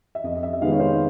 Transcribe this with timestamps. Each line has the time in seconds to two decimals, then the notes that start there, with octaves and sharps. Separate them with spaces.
0.15 E5
0.24 F2 D#5
0.35 D#5
0.43 E5
0.53 E5
0.61 C3 D#3 G#3 B3 F5
0.72 C#5
0.80 C5